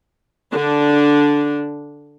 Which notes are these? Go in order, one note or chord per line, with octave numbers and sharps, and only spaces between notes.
D3 D4